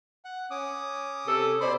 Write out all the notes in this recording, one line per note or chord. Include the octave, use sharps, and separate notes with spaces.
F#5
C#4 D6 D#6
C3 A4
B2 C5 D5 B5 C6 D6